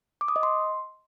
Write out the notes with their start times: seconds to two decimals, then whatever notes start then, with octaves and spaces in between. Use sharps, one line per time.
0.21 D6
0.28 D#6
0.36 D#5
0.43 C6